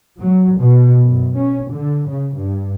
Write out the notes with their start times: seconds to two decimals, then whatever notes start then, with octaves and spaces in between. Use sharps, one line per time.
0.20 F#3
0.58 B2
1.04 F#2
1.37 C#4
1.70 D3
2.08 C#3
2.38 G2